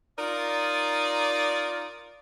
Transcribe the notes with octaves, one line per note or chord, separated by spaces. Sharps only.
D#4 F4 A#4 D5